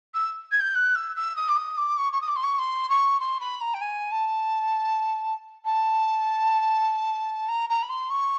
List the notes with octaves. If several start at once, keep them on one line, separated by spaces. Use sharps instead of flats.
E6
G#6
G6
F#6
E6
E6
D#6
D6
D#6
D6
C#6
C#6
D#6
D6
C6
C#6
C6
C#6
C6
B5
A#5
G5
G#5
A5
A5
A#5
A#5
B5
C6
C#6